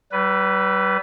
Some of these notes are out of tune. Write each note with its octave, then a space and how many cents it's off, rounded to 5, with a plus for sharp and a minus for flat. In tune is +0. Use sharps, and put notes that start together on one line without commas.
G3 -40 B4 +0